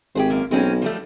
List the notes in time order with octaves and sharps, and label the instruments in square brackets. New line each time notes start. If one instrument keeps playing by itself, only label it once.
[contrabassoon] G#1 [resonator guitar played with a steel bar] G4 G#4 C5
[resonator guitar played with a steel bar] F#2 A#3
[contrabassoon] B1 [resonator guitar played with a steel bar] G#3 C4 C#4
[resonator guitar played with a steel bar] F3 G3 A3